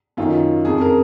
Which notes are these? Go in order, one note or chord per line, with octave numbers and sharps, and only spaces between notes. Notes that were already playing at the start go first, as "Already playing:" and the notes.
F#2 D#3 F4
F2 C#3 G#4
A#4